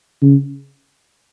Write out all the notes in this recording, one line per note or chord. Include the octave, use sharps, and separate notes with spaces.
C#3